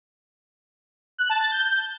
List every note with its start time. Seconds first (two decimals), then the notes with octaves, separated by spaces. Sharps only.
1.18 F#6
1.29 A5
1.41 A6
1.52 G6